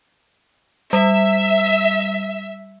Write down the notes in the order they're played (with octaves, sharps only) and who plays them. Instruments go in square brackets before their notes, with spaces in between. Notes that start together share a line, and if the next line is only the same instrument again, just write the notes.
[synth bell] G3 [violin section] E5